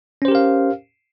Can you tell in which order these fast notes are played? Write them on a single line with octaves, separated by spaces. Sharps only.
C#4 C5 G4 A#4 F5